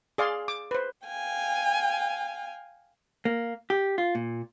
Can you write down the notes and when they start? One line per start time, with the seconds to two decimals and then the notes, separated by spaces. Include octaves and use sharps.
0.18 G#4 D5 F5 C6
0.48 D6
0.71 B4 C5
1.07 F5 G5 G#5
3.25 A#3
3.70 G4
3.98 F4
4.15 A#2